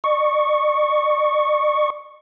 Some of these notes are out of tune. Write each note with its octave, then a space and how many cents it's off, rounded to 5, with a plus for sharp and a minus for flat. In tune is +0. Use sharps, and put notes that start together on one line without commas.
D5 +45 C#6 +0